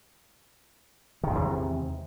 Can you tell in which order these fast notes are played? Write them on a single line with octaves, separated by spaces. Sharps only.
D#3 G#3 E2 C3